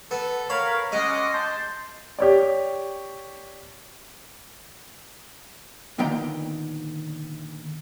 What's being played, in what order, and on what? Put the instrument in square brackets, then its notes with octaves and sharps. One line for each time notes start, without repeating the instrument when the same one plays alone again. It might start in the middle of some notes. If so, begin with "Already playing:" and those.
[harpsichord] B3 [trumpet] A4
[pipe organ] A#4 B5 [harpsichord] C#5 [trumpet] F5
[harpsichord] G#3 [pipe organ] C#4 F#5 D6 [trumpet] D#5
[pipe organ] A5 G6 [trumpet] C6
[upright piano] G4 C#5 D5
[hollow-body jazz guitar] A#2 D3 D#3 B3 G5 A#5